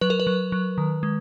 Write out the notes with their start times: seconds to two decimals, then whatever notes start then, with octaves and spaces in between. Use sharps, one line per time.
0.01 F#3 B4
0.10 A#4
0.20 B4
0.27 F#3
0.52 F#3
0.78 D#3
1.03 G#3